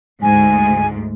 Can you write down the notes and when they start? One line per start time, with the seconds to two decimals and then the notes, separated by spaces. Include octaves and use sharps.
0.22 D2 G#2 G#5